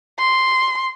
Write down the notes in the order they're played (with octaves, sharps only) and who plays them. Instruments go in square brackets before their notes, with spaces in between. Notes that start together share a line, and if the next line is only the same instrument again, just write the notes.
[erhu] C6